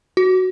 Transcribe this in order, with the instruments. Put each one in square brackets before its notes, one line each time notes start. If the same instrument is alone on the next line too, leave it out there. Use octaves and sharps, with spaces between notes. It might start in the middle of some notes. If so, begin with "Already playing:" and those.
[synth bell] F#4